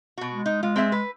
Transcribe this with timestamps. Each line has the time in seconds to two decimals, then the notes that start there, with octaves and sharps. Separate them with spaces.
0.18 B2 F#4
0.31 G#3
0.46 D#4
0.63 G#3 F4
0.76 C4 G#4 E5
0.92 B4